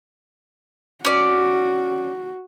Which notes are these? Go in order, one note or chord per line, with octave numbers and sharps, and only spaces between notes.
C#4 F#4 D5